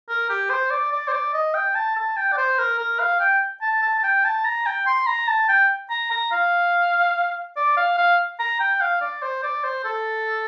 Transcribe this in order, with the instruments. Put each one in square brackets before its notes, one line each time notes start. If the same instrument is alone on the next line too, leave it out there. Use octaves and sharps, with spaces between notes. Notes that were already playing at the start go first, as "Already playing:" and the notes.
[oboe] A#4
G4
C5
D5
D5
C5
D5
D#5
G5
A5
A5
G5
D5
C5
A#4
A#4
F5
G5
A5
A5
A5
G5
A5
A#5
G5
C6
A#5
A5
G5
A#5
A#5
F5
D5
F5
F5
A#5
G5
F5
D5
C5
D5
C5
A4